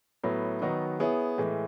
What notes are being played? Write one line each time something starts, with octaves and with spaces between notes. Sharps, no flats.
A2 F#3 B3
D#3 F#3 B3 D#4 F#4
B3 E4 G#4 C#5
A2 E3 G#3